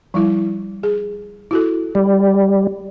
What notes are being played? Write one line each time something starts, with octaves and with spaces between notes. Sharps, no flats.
F3 G3 E4
G#4
E4 F#4 A4
G3